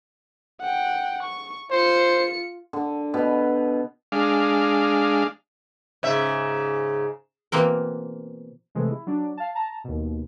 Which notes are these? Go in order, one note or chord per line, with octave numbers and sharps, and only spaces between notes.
F#5 G5
C#6
F4 C5 C#7
D3
B2
G#3 D4 F5
G#2 C#3 E5
B2 E3 A#3 C4 A#4
C3 E3 G#3 A3
E4
F#3 D4
F5 A5
A5 A#5
D#2 B2